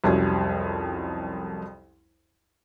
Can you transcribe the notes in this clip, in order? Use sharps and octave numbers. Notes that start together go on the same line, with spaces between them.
C2 F2 F#3 G3 C#4